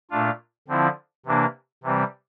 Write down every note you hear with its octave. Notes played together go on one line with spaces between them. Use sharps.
A#2 A3 D4 F4
D3 F3 C4 E4
C3 E3 A#3 D4
C3 E3 G3 C4